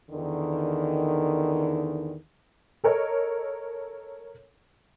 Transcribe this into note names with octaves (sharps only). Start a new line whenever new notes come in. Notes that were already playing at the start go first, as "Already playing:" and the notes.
E2 D3 D#3
A4 A#4 C#5 D#5